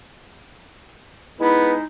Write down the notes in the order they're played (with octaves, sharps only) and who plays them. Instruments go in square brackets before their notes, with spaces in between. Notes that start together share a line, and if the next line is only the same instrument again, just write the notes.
[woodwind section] G#3 D#4 E4 [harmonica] B3